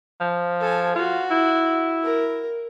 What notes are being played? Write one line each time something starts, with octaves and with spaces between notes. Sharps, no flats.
F3
A4 G#5
F4 F#4
E4
A#4